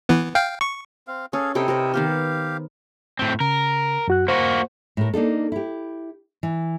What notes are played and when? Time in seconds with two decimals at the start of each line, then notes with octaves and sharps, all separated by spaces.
0.09 E3 B3
0.35 F5 G5
0.61 C#6
1.08 C4 F5
1.33 C#4 G#4 A4 F5
1.55 C3 D#4 E4 A4 G5
1.68 C3 A#4 C5
1.94 D#3 B3 G4 C5 F5
3.19 A2 C4
3.40 C#3 A#4
4.08 F#2 F#4 F#6
4.28 A#3 F#4 C5
4.97 A2 A#4
5.14 A#3 D4 D#4 A4
5.52 E4 G4
6.43 E3